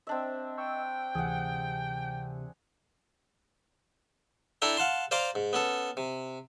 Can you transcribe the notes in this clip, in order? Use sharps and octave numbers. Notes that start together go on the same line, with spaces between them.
C4 D4 D#5 E5
G5 C#6 E6
D2 C3 E3 G#4 F#5 G#5
D4 E4 A4 G5 A#5
F5 F#5 A5 C6
C5 D5 F5 A#5 C6 D6
G#2
B3 C#4 A4
C3